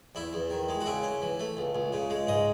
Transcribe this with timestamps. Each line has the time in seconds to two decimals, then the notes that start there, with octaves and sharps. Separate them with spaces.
0.15 E2 E4
0.33 E2
0.50 D#3
0.69 G#3
0.81 F#4
0.86 C#3 E4
1.03 C#4
1.22 E3
1.40 A3
1.57 C#2
1.75 C#2
1.93 C#3
2.10 G#3
2.27 G#2 D#5